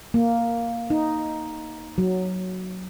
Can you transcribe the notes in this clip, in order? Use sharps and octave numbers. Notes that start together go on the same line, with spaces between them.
A#3
D#4
F#3